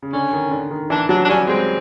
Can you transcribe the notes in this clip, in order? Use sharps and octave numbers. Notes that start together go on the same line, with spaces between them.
C#3
D3 C#4
D#3
D3
D#3
E3 D4
F#3 D4
D4
G3 C#4
G#3 C4